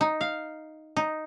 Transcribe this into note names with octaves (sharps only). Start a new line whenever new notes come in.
D#4
F5
D#4